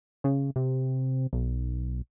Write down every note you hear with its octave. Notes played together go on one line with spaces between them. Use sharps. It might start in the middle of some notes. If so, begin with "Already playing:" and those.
C#3
C3
B1